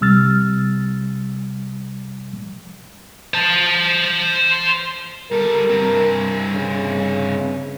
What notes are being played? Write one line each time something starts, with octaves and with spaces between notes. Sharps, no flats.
C2 C3 G3 E6 F6 A6
C5 A5
G3 A4 A#4
G2 C4
C#3